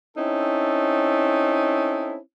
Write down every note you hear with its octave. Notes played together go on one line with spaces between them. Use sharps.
C4 C#4 D#4 E4 A4